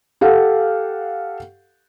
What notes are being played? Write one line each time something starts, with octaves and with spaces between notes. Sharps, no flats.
G4 A4 F5 F#5